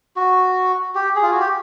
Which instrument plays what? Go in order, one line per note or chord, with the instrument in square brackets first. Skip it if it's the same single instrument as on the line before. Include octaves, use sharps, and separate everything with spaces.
[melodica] F#4
G4
G#4
F4
F#4
G4